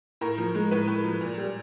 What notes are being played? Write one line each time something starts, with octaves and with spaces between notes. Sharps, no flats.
A2 A#4
F3
G#3
A2 B4
A2
F3
A#2
G3